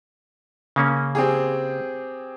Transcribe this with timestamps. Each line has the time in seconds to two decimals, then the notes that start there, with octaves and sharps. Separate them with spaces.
0.76 C#3 A#3 C#4
1.15 C4 G4 G#4